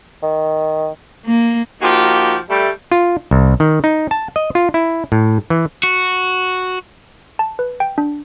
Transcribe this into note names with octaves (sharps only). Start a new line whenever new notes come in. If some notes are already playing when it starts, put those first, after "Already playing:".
D#3
A#3
F3 A#3 D#4 F#4 G4
G3 A3
F4
C2
D#3
D#4
A5
D#5
F4
E4
A2
E3
F#4
A5
B4
G5
D4